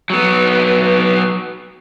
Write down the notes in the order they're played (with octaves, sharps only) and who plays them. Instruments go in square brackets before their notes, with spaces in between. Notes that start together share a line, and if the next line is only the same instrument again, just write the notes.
[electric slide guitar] F#3 B3